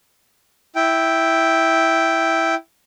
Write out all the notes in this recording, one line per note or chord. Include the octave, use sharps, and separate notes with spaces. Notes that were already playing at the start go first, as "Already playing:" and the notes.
E4 G5